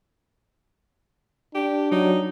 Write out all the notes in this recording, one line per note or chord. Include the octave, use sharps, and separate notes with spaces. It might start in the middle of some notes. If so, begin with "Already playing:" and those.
D4 G4
F#3 D#4